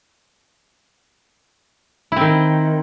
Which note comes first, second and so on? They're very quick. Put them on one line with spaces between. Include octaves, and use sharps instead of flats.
E4 C4 D#3